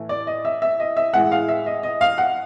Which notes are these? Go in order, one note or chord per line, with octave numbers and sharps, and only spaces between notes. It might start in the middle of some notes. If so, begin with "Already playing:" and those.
Already playing: A2 E3 A3
D5
D#5
E5
E5
D#5
E5
A2 E3 G#3 F#5
F5
E5
D#5
D#5
F5
F#5